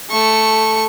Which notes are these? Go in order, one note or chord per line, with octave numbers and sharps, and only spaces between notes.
A3 C#6